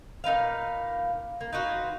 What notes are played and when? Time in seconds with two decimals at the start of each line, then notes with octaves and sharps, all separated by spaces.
0.24 A#2 D#4 B4 F5
1.41 A#3
1.52 D#4 F4 F#4 B4